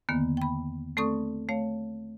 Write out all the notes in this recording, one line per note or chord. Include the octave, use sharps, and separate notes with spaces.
E2 D3 D#3 A#3 B3
G5 B5
A3 C4 A4 D5 C#6 D#6
A3 C#5 F5